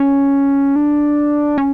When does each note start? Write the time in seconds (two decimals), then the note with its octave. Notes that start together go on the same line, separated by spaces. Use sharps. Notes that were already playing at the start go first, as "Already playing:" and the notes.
Already playing: C#4
0.76 D4
1.58 C#4